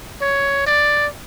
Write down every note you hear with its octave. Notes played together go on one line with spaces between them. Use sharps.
C#5
D5